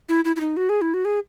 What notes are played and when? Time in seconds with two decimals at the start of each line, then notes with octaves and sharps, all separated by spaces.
0.09 E4
0.25 E4
0.36 E4
0.40 D#4
0.57 F#4
0.69 G#4
0.81 E4
0.94 F#4
1.05 G#4